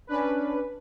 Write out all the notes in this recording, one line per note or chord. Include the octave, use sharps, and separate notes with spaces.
C#4 D4 B4